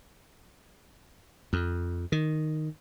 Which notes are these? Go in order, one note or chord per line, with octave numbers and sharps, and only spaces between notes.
F2
D#3